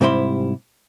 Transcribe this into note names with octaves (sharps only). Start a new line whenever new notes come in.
G#2 C3 G3 E4 C6